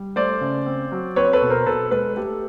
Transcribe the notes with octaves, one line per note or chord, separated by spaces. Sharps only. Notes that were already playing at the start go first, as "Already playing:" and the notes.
Already playing: G3
A3 C5 D5
C#3
C4
F#3
C4 B4 C#5
A4 B4
B2
A#4 C5
B2 A4 B4
G#3 A4 B4
A3 G4 A4